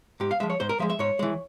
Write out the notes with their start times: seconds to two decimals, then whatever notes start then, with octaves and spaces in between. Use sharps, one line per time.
0.20 G#2 G4
0.31 F5
0.40 F3 G#3 E5
0.50 C#5
0.60 G#2 C5
0.69 A#4
0.79 F3 G#3 E5
0.90 E5
0.99 G#2 C#5
1.19 E3 G#3